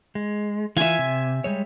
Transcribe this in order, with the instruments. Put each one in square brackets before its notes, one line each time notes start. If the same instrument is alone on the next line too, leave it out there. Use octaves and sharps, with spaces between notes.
[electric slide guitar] G#3
[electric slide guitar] E3 F4 [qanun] E5 G#5
[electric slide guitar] C3
G3 G#3 C#5